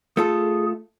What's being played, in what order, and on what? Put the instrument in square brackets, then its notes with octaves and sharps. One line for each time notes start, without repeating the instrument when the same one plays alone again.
[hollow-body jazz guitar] A3 F4 A4 [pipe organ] G#4